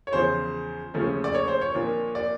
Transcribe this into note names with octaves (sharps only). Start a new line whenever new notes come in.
C#5
E2 C#3 F3 C5
D#2 C#3 F3 A3 C#4
D5
C#5
C5
C#5
A#2 F3 A#3 D4
D5